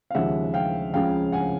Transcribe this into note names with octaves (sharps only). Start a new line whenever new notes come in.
F5
D#2 C#3 F3 G#3 E5 F#5
F5 G5
C#2 C#3 F3 F5 G5
F#5 G#5